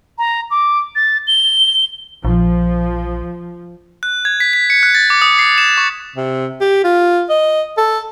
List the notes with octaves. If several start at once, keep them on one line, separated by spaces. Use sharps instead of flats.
A#5
D6
A6
G7
A#1 F3
F#6
G#6
B6
B6
C#7
F#6
A6
D6
D#6
C7
E7
C#6
C3
G4
F4
D#5
A4